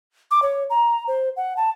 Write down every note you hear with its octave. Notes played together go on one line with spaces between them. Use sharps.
D6
C#5
A#5
C5
F#5
A5